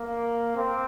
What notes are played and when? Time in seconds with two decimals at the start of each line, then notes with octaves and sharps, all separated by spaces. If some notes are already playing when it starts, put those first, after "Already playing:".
Already playing: A#3
0.56 C4